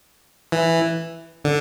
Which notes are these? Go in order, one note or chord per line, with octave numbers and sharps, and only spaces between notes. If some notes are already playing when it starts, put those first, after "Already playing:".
E3
D3